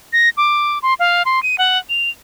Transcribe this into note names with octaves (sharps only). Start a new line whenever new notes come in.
A#6
D6
C6
F5
C6
D#7
F#5
F7